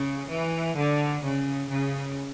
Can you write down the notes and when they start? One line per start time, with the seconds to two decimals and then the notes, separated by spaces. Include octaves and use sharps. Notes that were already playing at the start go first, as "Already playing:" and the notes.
Already playing: C#3
0.30 E3
0.77 D3
1.24 C#3
1.70 C#3